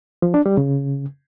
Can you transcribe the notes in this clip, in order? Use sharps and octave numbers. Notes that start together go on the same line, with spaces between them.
F3
D4
G3
C#3